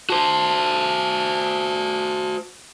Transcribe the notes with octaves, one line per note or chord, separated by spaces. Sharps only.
F#4 C5 A5